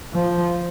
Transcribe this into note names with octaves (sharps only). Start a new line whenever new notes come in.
F3